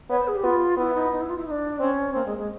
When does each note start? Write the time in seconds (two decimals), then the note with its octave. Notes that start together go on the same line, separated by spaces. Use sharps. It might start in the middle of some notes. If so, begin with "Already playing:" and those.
0.09 B3 C#5
0.18 C5
0.27 G#4
0.35 G4
0.43 B3 F4
0.77 B3 E4
0.94 D#4
1.12 D#4
1.21 E4
1.29 F4
1.37 E4
1.46 D#4
1.50 D4
1.79 C4 C#4
2.13 A#3 C4
2.25 G#3
2.37 G#3